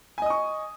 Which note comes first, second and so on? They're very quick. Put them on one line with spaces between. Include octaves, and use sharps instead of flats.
G#5 D#5 D#6 C#6